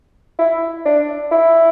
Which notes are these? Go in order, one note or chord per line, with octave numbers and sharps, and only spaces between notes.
E4
D4
E4